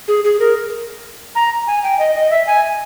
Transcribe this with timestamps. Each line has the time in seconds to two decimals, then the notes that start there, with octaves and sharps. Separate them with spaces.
0.08 G#4
0.24 G#4
0.40 A#4
1.35 A#5
1.67 G#5
1.83 G5
1.99 D#5
2.15 D#5
2.30 E5
2.47 G#5